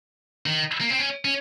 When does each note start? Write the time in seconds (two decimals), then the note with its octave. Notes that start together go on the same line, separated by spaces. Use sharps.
0.46 D#3
0.81 A#3
0.90 C4
0.99 C#4
1.25 C#4